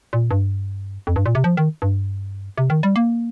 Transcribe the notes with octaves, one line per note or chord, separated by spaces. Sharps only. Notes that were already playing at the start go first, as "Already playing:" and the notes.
A#2
G2
F2
G2
A#2
C3
F3
D#3
G2
C3
D#3
G3
A#3